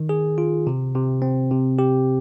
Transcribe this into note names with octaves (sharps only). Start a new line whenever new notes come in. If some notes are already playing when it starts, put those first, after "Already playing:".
Already playing: D#3
G#4
F4
C3
C3
C4
C3
G4